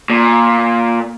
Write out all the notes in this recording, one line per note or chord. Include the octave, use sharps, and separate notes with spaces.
A#2